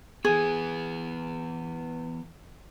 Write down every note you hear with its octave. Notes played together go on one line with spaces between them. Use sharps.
E3 B3 G#4